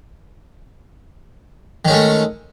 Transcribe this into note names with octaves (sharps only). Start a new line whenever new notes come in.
D#3 G#3 A3 C#4